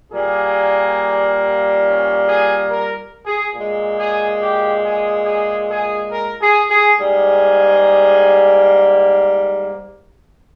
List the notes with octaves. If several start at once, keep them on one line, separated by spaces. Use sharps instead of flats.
A#2 G3 A#3 G#4
C#4
G#4
A#4
G#4
A#2 G#3
G#4
G4
G#4
G#4
G#4
A#4
G#4
G#4
G#2 G3 A#3 G#4